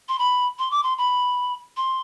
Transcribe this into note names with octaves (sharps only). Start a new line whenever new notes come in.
C6
B5
C6
D6
C6
B5
C6